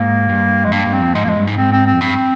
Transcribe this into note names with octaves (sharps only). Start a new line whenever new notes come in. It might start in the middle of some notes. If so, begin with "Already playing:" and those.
Already playing: G#2 A#3
G2
F2 G#3
G2 A#3
G2
C4
F2
G#2 G#3
F2 G#3 A#3
G2
G#2
G#2 C4
C4
C4
F2
G2 C4